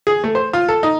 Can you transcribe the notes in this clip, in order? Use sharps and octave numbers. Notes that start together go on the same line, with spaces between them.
G#4
A3
C5
F4
A4
D#4